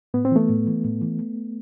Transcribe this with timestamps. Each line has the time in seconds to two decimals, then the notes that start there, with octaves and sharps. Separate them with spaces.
0.14 A2 B3
0.25 C4
0.31 E3 A3 B3
0.49 A2
0.67 E3
0.84 A2
1.01 E3